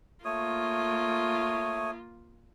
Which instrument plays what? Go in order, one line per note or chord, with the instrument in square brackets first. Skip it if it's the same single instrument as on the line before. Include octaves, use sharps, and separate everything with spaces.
[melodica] A3 C#5 D#6 [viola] A#3 F4